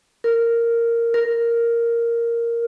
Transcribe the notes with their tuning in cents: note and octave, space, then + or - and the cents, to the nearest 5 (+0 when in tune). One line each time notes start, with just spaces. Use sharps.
A#4 -5
A#4 +0